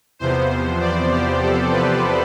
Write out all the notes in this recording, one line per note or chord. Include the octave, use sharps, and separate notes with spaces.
E2 C3 F3 B3 C5
D5
G4
A4
B4